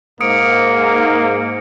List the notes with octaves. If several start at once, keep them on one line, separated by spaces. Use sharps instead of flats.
G#2 A#3 D#6 C#7 D7